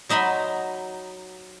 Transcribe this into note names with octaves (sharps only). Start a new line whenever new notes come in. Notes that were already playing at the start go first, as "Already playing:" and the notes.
F#3 D#4 E5 B5 C6